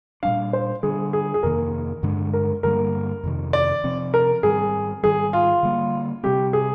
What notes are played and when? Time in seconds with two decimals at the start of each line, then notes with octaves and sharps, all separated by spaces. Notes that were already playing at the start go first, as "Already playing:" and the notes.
0.23 A#2 G3 D4 F5
0.53 C5
0.83 D3 G3 D4 G#4
1.13 G#4
1.34 G#4
1.43 F2 C3 D#3 A#3 A#4
2.03 G2 D3 G#3 D4
2.33 A#4
2.63 G2 D3 G3 A#3 A#4
3.24 F2 C3 D#3
3.53 D5
3.84 C3 F3 C4
4.14 A#4
4.43 G#2 D#3 G3 C4 G#4
5.03 G#2 D#3 G3 G#4
5.33 F4
5.63 D3 G3 A#3
6.24 C3 G3 C4 G4
6.53 G#4